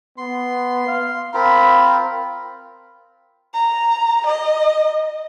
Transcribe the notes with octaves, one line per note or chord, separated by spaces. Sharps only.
B3 C6
F5
C4 F4 A#4 B5
A#5
D#5